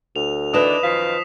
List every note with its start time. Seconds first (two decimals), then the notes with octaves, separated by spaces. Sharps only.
0.16 D2 F7
0.54 D#3 E3 D4 B4 D#5 D#6 E7
0.83 F#2 D#3 F3 F5 B6 C7